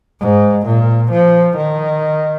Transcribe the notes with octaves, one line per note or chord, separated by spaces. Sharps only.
G#2
A#2
F3
D#3